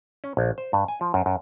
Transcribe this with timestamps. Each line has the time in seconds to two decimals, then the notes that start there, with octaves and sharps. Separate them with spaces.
0.24 C#4
0.37 A#1
0.58 C5
0.73 G2
0.88 G#5
1.01 F3
1.14 F#2
1.26 F#2